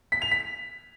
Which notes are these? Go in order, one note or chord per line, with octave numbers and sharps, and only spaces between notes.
B6
F7
B6